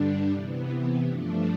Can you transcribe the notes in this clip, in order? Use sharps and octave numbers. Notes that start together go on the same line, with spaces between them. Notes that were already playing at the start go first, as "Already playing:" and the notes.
Already playing: G2 D3 G3 D4
C3 E3 B3
G2 F3 A3 D4